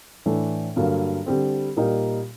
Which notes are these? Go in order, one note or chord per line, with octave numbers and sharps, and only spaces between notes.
A2 E3 A3 D4
G2 D3 F#3 A#3
D3 G3 C4
A#2 G3 A#3 D#4